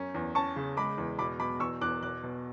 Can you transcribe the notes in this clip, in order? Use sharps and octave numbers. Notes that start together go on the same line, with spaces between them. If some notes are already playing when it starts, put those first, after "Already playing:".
Already playing: F#2 C#4
E2
C#4 A5 C#6
C#3
G#3 B5 D6
E2
B2 B5 D6
B2 B5 D6
E2 C#6 E6
E2 D6 F#6
B2 D6 F#6
B2